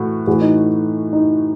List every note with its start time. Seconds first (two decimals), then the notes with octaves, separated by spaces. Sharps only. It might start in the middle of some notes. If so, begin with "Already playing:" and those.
Already playing: A2 E3 F#4
0.27 A2 E3 F#4
0.41 D#4
1.13 D#4